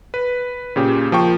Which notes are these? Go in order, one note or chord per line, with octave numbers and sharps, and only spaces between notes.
B4
A#2 C#3 G4
F3 A#3 G5 C#6